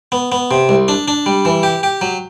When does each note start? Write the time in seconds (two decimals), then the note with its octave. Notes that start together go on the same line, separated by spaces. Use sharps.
0.12 B3
0.32 B3
0.51 C3
0.69 C2
0.88 D4
1.08 D4
1.26 G3
1.45 E3
1.63 G4
1.83 G4
2.01 F#3